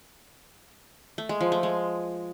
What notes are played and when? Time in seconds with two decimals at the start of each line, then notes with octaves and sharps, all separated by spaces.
1.18 A3
1.29 G#3
1.41 F3
1.52 A3
1.63 G#3